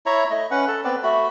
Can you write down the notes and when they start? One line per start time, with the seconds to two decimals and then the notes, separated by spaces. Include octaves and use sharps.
0.06 E4 C#5 E5 A#5
0.30 A3 D#5
0.51 C#4 B4 F#5
0.68 A4
0.84 B3 C4 B4 D5
1.03 A3 F#4 B5